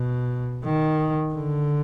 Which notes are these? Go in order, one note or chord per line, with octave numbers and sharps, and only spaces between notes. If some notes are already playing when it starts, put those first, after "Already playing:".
Already playing: B2
D#3
D3